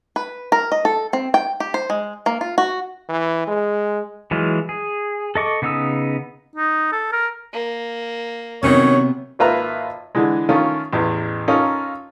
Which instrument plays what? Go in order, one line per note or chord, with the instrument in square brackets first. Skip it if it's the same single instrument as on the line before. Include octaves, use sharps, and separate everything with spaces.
[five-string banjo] B4
A#4
D#5
A4
C4
G5
G4
C5
G#3
A#3
F4
F#4
[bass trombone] E3
G#3
[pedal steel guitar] E3 F#3 G#3 F4
G#4
A4 D#5 C#6 D6
C#3 B3 D#4 D#6 E6
[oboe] D#4
A4
A#4
[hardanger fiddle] A#3
[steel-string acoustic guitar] C3 B3 [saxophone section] D#3 F#3 C#4 [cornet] C#5
[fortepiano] G#1 A#3 F4 B4 E5 A#5
D3 E3 G#3
D#3 A3 C#4 F4
A1 E2
C#4 D#4 F4 A4 A#4